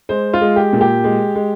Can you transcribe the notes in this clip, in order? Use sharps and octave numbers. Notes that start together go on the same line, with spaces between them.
G#3 C5
F4
G#3
G4
A#2
G4
G#3
G#3